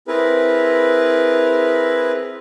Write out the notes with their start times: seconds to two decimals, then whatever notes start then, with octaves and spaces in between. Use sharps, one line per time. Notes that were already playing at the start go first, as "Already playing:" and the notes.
0.08 C4 E4 G#4 A#4 B4